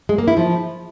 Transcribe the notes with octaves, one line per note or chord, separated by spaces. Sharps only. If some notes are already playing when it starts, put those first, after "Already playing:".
G#3
A#3
E4
F3